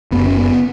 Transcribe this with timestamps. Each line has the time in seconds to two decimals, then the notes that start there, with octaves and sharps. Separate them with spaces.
0.11 F#1 F#2 C#3 B3
0.25 C#4
0.37 B3